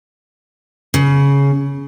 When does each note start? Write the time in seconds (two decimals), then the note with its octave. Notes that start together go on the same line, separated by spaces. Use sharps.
0.94 C#3